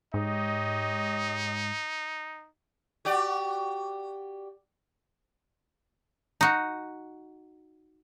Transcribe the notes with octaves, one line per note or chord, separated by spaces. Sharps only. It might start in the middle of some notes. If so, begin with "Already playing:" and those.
G#2 D#4 G4 C#5 D#5
F#4 G4 D5
D#4 F#4